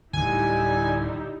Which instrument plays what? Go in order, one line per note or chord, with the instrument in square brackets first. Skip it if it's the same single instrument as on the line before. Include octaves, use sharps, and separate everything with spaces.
[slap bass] D1 [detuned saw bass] D3 [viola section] G3 D#4 E4 [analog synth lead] G#5